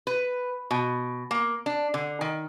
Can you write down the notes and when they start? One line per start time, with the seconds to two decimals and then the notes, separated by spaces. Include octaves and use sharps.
0.07 B4
0.71 B2
1.31 A#3
1.66 D4
1.94 D3
2.21 D#3